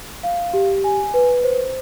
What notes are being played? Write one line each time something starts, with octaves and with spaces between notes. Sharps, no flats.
F5
G4
G#5
B4
C5